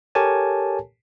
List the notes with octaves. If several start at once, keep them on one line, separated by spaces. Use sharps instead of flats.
G4 A4 A#4 C#5 G#5 A5